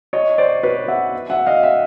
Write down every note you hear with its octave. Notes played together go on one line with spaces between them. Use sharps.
C#5 D#5
C5 D5
B4 C#5
E5 F#5
E5 F#5
D#5 F5
E5 F#5